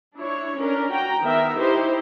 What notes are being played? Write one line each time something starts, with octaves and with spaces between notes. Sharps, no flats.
D4 E4 C#5
C#4 D4 A#4
F#4 G5 A#5
D#3 B3 A#4 E5
D#4 E4 G4 C5